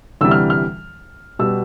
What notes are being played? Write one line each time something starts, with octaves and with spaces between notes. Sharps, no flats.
D2 C3 E3 G3 E6
F6
F6
B2 G3 B3 E6